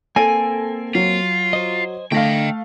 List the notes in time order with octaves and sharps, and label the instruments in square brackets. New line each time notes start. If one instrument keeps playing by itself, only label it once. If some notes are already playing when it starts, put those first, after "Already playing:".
[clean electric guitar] A#3 C4 [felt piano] A4 [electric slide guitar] G#5
[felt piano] F#3 [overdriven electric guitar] F4
[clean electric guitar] C5 D#5
[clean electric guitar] D3 [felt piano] A3 F5 [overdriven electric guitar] D#5 G5